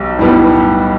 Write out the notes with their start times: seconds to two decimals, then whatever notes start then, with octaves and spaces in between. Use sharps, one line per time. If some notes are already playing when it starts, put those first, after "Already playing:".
Already playing: B1 G3
0.19 B1 A2 G3 B3